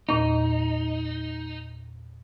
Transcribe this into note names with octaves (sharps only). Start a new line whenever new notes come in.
E2 A#2 D#4